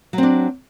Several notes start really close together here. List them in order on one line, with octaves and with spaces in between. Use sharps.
F#3 C4 D4